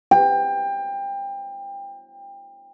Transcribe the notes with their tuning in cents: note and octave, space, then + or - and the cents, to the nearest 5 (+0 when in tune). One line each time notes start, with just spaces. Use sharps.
G5 +25